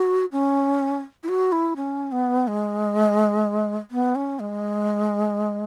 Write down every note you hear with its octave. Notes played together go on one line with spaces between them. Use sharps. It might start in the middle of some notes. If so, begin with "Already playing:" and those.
Already playing: F#4
C#4
E4
F#4
E4
C#4
B3
G#3
B3
C#4
G#3